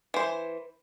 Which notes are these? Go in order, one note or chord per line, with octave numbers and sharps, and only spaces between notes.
E3 C5